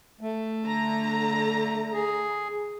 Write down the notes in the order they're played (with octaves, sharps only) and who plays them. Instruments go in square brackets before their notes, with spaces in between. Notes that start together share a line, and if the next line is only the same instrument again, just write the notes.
[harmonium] A3
[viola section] D3 A#5
[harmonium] G#4